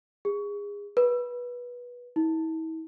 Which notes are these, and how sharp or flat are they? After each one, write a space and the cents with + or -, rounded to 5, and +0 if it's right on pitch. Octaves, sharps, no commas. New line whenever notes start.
G#4 -25
B4 -20
E4 -45